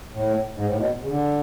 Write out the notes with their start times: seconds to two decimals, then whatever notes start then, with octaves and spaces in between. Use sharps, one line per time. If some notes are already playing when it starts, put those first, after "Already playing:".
0.13 A2
0.55 G#2
0.66 A2
0.76 B2
1.02 C#3
1.08 D3